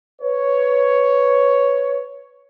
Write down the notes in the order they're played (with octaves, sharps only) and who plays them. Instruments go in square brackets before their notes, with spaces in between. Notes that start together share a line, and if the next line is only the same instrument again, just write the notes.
[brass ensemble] B4 C#5